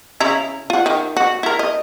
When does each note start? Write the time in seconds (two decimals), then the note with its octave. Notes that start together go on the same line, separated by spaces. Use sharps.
0.20 C#3 E4 A#5
0.70 F4 F#5
0.86 D#3
1.17 F#4
1.43 E4 A#4
1.59 D#5